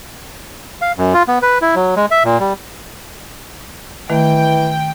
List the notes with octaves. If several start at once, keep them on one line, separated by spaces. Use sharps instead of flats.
F5
F#2
F4
B3
B4
E4
F#3
G#3
E5
A#2
G3
D#3 E3 A3 G5